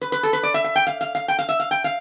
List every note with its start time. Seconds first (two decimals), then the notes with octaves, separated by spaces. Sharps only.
0.01 B4
0.12 B4
0.23 A4
0.33 B4
0.43 D5
0.54 E5
0.64 E5
0.76 G5
0.87 F5
1.01 F5
1.15 F5
1.28 G5
1.39 F5
1.49 E5
1.60 F5
1.71 G5
1.84 F5